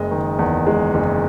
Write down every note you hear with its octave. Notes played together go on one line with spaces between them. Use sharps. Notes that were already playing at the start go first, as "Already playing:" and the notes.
Already playing: F#1 G#3 D#5
D#3
E2
G#3
F#1